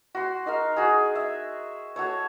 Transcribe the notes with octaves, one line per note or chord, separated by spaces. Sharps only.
F#4 C6
D#4 A#4 F5
F#4 G#4
E5
F#4 A4 C#5